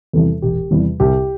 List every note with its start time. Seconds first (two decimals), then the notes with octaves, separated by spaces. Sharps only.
0.13 E2 C3 E3 G3 A4
0.42 E1 G4
0.71 E2 C3 E3 G3
1.00 C2 G4